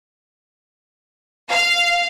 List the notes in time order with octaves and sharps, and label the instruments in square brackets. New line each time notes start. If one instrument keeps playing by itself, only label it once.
[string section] F5